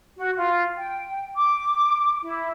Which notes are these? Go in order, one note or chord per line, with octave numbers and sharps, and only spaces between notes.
F#4
F4
G5
D6
E4